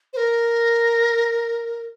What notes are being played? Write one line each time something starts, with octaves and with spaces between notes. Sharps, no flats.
C5
A#4